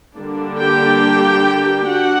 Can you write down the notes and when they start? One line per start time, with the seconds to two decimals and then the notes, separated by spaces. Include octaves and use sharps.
0.17 D3 G3 A#3 D4
0.59 G4 G5
1.89 D4 F#4 F#5